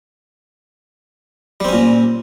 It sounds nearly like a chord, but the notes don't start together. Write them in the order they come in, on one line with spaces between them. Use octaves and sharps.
G3 C4 C#4 A#2